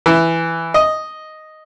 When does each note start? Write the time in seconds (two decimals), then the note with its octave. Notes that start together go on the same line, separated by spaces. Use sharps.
0.06 E3
0.74 D#5